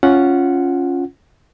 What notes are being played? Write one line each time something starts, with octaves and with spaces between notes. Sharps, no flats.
C#4 F4 F#5